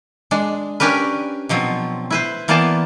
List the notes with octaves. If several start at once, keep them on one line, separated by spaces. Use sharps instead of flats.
G#3 D4
C#4 D4 G4 A#4 B4
B2 F3 F#3 C4
E4 B4 C5
E3 A#3 B3 C5 D5 A5